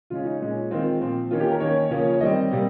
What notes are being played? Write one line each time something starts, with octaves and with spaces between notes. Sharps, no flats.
C#3 G#3 C#4 F4
D#4
A#2 G#3 C#4
D#3 G#3 C4 F4
A#2 F3 C4
D#3 A#3 C#4 F4
G4
A#4
D#3 A#3 C#4 C#5
C#3 F3 A#3 C#4
C#5
D#3 G3 C4 D#5
C3 G3 A#3